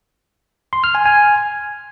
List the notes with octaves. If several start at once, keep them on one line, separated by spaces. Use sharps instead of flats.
C6
F6
G#5
G#5